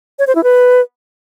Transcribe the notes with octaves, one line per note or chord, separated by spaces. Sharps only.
C#5
C5
E4
B4